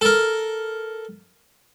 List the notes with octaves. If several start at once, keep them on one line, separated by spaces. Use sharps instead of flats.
A4 A#4